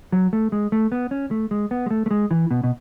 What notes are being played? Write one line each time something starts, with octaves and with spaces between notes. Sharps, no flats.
F#3
A3
G#3
A3
B3
C#4
A3
G#3
B3
G#3
A3
A3
G#3
E3
B2
B2